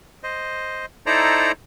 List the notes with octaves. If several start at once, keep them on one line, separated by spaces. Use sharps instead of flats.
C5 D#5
D#4 E4 A4 C5 D5 A#5